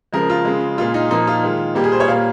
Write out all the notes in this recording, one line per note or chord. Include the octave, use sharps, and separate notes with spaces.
C#3 F3 G#3 A#4
F4
C#3 G#3
A#2 G#3 F4
D#4
A#2 F3 A#3 D#4
F4
D#3 G#3
A#2 G3 A#3 G4
G#4
C5
C#5
A#2 G3 A#3 F5